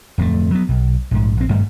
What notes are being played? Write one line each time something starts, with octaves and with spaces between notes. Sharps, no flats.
D1 F2 F#3 A3
F#3 B3
B1
A#1 G#2
A#1 C4
G#1 G2 G3 A3